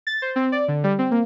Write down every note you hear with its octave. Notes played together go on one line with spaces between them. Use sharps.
A6
C5
C4
D5
D3
G3
C4
A#3